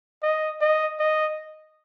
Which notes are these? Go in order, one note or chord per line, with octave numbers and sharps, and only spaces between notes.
D#5
D#5
D#5